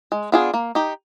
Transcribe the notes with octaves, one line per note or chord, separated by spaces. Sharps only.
G#3
B3 D4 F4 G#4
A#3
D#4 G4